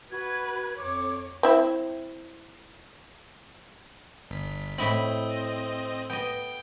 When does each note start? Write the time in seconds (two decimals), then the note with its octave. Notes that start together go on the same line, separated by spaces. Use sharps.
0.11 F#4 B4 G#6
0.78 F2 C#5 D6
1.43 C4 E4 E5
4.30 G1 B6
4.78 A2 C4 E4 D#5 B5
6.10 B3 D#5 G5